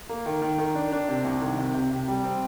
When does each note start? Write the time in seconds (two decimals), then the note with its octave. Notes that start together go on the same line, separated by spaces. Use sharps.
0.09 A#3
0.26 D#3
0.42 D#3
0.58 D#3
0.75 D4
0.92 D4
1.08 C3
1.24 C2
1.41 D#3
1.59 C3
1.74 C3
1.91 C3
2.08 G3
2.24 C4